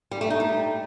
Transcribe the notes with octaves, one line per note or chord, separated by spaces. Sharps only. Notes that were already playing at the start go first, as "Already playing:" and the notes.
G3
A3
D#4
G3